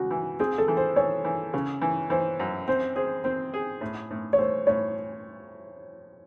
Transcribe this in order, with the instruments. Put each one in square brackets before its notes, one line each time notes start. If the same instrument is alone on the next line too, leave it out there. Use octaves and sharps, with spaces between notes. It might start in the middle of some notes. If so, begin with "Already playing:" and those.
Already playing: [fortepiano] C#2 C#3 [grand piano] F#4
[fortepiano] E3
[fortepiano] C4 [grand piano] G#4
[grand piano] A4
[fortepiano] E3
[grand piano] C5
[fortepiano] E3 [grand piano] C#5
[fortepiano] E3
C#3
E3
[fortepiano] E3 [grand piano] C5
[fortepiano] F#2
[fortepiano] C4 [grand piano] C5
[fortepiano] G#4 [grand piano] C5
[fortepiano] C4 [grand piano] C5
[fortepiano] G#4
A2
A2
[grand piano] C#5
[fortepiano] A3 [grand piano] C5
[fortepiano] A2 [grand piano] C#5